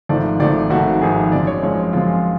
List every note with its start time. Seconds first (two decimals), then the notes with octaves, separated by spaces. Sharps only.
0.09 G#1 G#2 F3 A3 D5
0.40 G#1 G#2 F3 A3 D5
0.70 G#1 G#2 F3 A3 F#4
1.01 G#1 G#2 F3 A3 G#4
1.32 F#2 F3 G#3 D5
1.47 C#5
1.63 F#2 F3 G#3 C#5
1.93 F#2 F3 G#3 F4